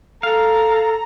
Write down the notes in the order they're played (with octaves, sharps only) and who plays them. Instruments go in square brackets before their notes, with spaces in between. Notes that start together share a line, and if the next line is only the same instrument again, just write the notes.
[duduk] A4 [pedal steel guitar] F5 [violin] A#5